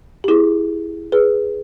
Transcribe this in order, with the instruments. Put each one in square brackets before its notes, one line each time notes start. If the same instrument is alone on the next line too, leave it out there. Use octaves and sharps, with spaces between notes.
[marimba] G4
E4 G#4
G#4 B4